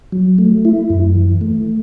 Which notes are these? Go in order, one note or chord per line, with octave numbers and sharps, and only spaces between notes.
F#3
A3
E4
F#2
E3
A3